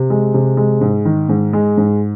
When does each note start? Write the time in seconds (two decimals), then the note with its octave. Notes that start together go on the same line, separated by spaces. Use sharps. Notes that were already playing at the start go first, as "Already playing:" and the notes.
Already playing: C3
0.10 G#3
0.34 C3
0.57 G#3
0.81 G#2
1.05 D#3
1.29 G#2
1.53 G#3
1.77 G#2